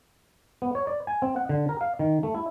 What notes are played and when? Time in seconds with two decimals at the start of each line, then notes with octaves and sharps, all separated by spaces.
0.62 B3
0.75 C#5
0.87 D5
1.07 G#5
1.22 C4
1.36 F#5
1.49 D3
1.69 A#4
1.81 F5
1.99 D#3
2.23 A3
2.35 E4